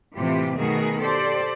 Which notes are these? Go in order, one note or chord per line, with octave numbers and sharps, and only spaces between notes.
A2 C3 E3 F4 G4
B2 D#3 A3 F#4 G#4 A#4
G4 A4 C5 D5